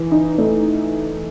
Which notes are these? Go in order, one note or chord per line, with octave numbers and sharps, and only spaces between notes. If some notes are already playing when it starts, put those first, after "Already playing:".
Already playing: E3
D#4
A3